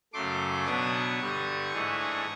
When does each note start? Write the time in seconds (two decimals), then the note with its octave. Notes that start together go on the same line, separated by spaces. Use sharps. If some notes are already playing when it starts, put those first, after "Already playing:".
0.13 F#2 C#3 F#3 A3 C6 D6
0.66 B2 F#3 B3 D4 C#6 D#6
1.19 G2 D3 G3
1.72 G#2 E3 A3 D4